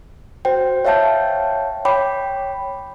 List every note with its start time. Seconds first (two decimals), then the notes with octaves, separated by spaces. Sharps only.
0.45 F#4 C5 G5
0.85 C#5 E5 F5 G5 A5 G6
1.85 C#5 G5 B5 D6